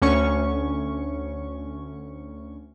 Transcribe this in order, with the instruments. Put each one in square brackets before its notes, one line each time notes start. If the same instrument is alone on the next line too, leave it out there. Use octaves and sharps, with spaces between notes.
[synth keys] D2 C#4 C#6